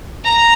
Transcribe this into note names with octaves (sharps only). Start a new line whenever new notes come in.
A#5